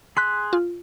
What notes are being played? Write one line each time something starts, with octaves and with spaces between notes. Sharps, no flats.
G#4 C6 F#6 B6
F4